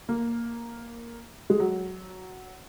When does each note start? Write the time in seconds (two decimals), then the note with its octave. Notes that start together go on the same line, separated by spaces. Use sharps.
0.09 A#3
1.50 G#3
1.60 F#3